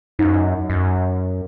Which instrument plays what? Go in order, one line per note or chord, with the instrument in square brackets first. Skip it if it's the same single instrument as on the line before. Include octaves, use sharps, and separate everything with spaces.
[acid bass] F#2 [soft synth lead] D#4
[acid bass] F#2